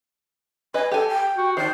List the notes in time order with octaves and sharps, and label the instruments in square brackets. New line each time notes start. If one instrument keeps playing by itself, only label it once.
[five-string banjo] B4 D#5 [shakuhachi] G#5
[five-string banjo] G4 G#5 [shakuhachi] A4
[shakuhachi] G5
[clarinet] F#4
[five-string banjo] D#3 [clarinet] C5 [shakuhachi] D5